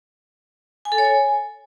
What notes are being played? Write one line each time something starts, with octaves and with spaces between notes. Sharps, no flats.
G#5
A4
C#5
G#5